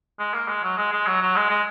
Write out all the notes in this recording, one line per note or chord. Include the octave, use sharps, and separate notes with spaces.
G#3
A#3
G#3
F#3
G#3
G#3
F#3
F#3
G#3
G#3